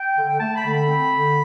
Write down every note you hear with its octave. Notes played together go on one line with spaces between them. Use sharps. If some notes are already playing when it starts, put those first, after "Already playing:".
Already playing: G5
D3
G5
A3 A5
B5
D3
B5
C4
D3